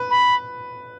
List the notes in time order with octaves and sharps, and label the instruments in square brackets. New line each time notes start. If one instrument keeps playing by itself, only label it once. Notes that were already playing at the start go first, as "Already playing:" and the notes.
Already playing: [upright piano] B4
[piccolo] B5